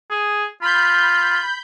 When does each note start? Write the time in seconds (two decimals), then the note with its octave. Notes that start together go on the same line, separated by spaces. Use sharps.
0.10 G#4
0.62 F4 B5 G6